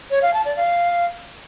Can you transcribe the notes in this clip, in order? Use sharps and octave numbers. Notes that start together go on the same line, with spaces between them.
C#5
F5
A5
D5
F5